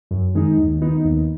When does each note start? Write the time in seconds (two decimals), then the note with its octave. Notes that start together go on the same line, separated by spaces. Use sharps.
0.11 F#2
0.35 D#3 G#3 D#4
0.58 D#2
0.82 D#3 B3 D#4
1.05 D#2